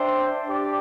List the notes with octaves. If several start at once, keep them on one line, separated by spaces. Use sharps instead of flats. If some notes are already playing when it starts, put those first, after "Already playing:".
Already playing: D4 C5 E5 G5
D4 G4 D5